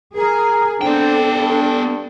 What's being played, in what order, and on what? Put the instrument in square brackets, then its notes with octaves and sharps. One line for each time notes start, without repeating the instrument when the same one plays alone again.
[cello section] G#4 [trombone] A#4
[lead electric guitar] B3 G5 [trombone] C4 [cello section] D4 A4
[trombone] G2